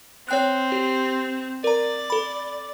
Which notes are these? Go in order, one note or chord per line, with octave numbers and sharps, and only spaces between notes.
C4 C#5 G5 F#6
G4
A#4 D5 A#5
A4 B5